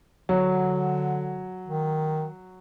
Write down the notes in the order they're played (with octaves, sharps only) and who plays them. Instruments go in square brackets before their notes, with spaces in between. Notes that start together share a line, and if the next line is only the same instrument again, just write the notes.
[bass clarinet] D3 [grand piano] F#3
[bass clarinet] D#3